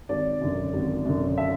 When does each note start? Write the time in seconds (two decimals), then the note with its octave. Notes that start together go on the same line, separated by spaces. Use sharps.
0.09 G#1 D5
0.41 F#2 D3
0.74 G#1
1.05 F#2 D3
1.38 E5